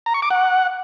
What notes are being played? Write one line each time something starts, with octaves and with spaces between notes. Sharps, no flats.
A#5
C#6
D6
F#5